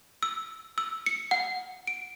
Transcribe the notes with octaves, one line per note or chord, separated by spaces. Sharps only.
E6
E6
C#7
F#5
D7